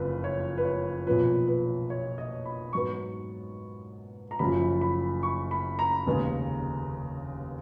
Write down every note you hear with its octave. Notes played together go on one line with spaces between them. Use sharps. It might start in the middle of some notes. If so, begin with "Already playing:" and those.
Already playing: F#1 F2 F3 B4
C#5
B4
C#5
B1 A#2 F3 B4
B4
C#5
D#5
B5
G#2 F#3 B3 C#6
A#5
F#1 F#2 F3 B5
B5
C#6
B5
A#5
F1 D#2 C#3 G#3 B3